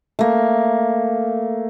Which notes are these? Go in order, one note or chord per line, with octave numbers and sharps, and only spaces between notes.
A3 A#3